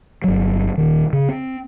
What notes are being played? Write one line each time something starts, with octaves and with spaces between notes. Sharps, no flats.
G1 F#3
D#1 D#3
C#3
C4